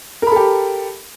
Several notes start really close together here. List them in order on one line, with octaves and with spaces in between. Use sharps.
A#4 B5 A4 G4